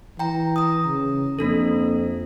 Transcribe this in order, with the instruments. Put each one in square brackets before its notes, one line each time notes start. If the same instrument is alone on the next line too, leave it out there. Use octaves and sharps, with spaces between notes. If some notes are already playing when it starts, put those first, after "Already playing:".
[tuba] E3 [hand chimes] G5 A#5
[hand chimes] A#5 D#6
[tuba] C#3
[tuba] F2 [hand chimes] A#3 D4 A4